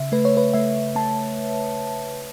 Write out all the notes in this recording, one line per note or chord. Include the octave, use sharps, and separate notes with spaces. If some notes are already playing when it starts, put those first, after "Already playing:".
Already playing: C#3 E5
A3 B4
C#5
B4
A3 E5
A3 A5